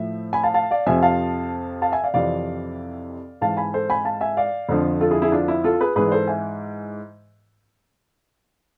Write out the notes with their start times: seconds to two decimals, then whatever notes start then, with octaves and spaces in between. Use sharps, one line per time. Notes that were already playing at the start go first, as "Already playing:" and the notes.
Already playing: A2 F3 E5
0.33 G#5 B5
0.43 F5 A5
0.54 F5 A5
0.71 D5 F5
0.87 F2 C3 F3 E5 G#5
1.02 F5 A5
1.82 F5 A5
1.92 E5 G#5
2.04 D5 F5
2.14 F2 C3 E3 D5 F5
3.41 G#2 E3 F5 A5
3.57 G#5 B5
3.73 A4 C5
3.90 G#5 B5
4.05 F5 A5
4.21 E5 G#5
4.37 D5 F5
4.69 F2 D3 F3
5.01 F4 A4
5.11 E4 G#4
5.22 E4 G#4
5.32 D4 F4
5.48 E4
5.64 F4 A4
5.81 G#4 B4
5.96 G#2 E3 G#4 B4
6.08 D5
6.12 A4 C5
6.28 E5 G#5